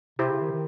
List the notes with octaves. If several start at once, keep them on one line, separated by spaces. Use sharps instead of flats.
C3 E4 G4 C5
C#3
D#3
D#3